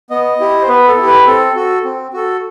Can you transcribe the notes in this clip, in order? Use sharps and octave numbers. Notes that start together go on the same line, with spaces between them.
B3 D#5
E4 G4
C5
B3 B4
A4
E4 G4
B4
C4 A4
F#4 A4
C4
F#4 A4